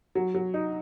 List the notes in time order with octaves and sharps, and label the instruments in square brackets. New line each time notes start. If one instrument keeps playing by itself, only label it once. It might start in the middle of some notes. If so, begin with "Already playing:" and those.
[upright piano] F#3
F#3
D#4